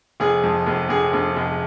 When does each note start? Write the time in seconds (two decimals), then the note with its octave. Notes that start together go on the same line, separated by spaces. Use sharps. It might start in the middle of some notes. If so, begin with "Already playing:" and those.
0.20 F1 G#4
0.43 F2
0.67 F1
0.89 F1 G#4
1.13 F1
1.36 F1